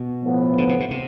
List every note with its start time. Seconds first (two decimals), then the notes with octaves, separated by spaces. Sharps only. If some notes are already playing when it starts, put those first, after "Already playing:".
Already playing: B2
0.23 A2 F3 B3
0.58 D3
0.69 C3
0.80 B2
0.91 C3